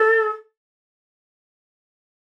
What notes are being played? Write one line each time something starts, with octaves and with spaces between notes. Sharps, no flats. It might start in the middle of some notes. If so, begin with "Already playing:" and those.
Already playing: A4